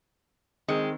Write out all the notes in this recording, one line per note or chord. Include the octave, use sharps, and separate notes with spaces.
D#3 G#3 C4